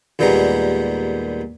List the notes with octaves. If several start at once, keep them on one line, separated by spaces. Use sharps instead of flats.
D#2 A#2 G3 G#3 B3 A#5